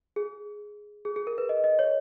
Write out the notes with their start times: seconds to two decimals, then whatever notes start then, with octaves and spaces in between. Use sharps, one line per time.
0.16 G#4
1.05 G#4
1.16 G#4
1.27 A#4
1.38 B4
1.49 D#5
1.64 D#5
1.79 C#5